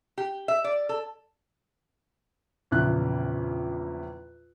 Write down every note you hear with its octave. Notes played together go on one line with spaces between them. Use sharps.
G4
E5
D5
A4
A#1 E2 C#3 E3 F#6